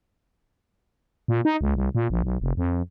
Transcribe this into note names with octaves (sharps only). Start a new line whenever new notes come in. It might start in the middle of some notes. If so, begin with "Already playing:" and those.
A#2
D#4
C#2
C2
A#2
A#1
B1
F1
F2